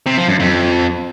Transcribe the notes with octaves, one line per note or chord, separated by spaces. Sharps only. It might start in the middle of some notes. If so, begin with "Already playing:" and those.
C3
F3
F#2
F2